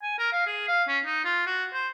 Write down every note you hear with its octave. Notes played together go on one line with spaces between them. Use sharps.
G#5
A#4
F5
G#4
F5
C#4
D#4
F4
F#4
C5